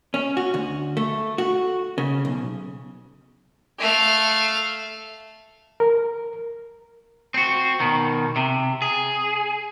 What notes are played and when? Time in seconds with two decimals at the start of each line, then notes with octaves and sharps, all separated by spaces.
0.14 C#4
0.37 F#4
0.54 D2
0.97 A3
1.38 F#4
1.98 C#3
2.25 B1
3.79 A3 F5
5.80 A#4
7.34 C4 F#4
7.80 B2 D#3
8.36 C3
8.82 G#4